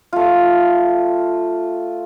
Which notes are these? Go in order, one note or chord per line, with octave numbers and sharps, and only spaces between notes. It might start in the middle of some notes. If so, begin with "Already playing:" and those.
A3 F4